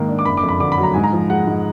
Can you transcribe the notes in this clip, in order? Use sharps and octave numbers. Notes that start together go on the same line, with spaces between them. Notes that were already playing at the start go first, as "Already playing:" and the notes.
Already playing: G#2 D#3 A#3
D4
D6
F#1 B5
D6
F2
B5
D3 D6
B5
F#3
A#5
G#2 G#5
A#5
F3
G#3 F#5
G#2